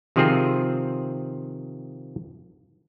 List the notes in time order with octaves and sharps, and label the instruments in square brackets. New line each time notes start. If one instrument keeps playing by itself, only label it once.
[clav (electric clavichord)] C3 D#3 F3 C4 F4 G#4